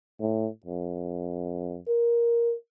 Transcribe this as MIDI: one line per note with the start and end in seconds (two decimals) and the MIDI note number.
0.21 0.48 45
0.66 1.78 41
1.88 2.54 70